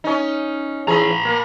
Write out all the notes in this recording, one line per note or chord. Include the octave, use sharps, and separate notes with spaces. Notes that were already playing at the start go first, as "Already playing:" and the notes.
C#4 D#4
E3 G#4 A#5 B5
A#3